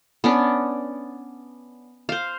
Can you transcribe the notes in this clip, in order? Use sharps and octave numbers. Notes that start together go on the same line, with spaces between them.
B3 C#4 D4
C5 F5